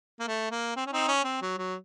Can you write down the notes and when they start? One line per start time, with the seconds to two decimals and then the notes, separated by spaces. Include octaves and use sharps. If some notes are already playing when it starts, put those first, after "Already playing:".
0.20 A#3
0.27 A3
0.51 A#3
0.76 C4
0.86 C#4
0.93 C4 D#4
1.08 C#4
1.24 C4
1.42 F#3
1.58 F#3